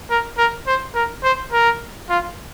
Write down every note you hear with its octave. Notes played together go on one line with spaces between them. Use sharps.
A#4
A#4
C5
A#4
C5
A#4
F4